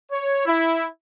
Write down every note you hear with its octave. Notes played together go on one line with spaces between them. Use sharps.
C#5
E4